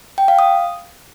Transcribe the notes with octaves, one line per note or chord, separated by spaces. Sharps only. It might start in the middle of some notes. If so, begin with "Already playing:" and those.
G5
F5
D#6